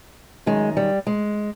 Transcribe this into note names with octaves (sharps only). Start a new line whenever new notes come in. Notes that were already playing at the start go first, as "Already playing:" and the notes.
F#2 D#3 G#3
G3
G#3